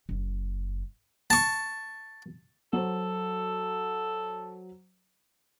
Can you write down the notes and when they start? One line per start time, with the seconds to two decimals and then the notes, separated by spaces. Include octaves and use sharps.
0.09 F#1
1.30 A5 C#6
2.73 F#3 A4 C5